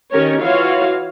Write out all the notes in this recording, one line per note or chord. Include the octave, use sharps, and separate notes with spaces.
D#3 C#4 G4 A#4 C#5
E3 F4 F#4 C#5 F5